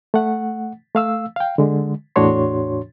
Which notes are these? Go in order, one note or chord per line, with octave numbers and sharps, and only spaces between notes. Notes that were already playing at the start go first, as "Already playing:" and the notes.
A3 F#5
A3 F5 E6
F5 G5
D3 G#3
E2 A2 D4 F#4 C#5 C6